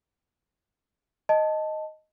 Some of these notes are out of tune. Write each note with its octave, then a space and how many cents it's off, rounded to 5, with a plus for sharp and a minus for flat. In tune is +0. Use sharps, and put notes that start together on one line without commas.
D#5 +0 A5 +0